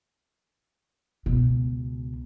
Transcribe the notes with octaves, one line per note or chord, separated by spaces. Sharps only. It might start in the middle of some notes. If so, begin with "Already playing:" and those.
C#2 B2